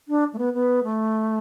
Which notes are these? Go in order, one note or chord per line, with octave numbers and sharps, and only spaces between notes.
D4
A3
B3
B3
A3